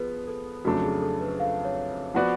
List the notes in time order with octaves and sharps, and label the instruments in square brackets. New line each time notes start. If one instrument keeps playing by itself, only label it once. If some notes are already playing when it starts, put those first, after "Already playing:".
Already playing: [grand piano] F3 B3 [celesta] G#4 B4
[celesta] A4
[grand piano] F2 C#3 F#3 A3 D4 [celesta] F#4
[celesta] A4
G#4
A4
B4
F5
C#5
[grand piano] F3 B3 F#4 B4 D5 [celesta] F#5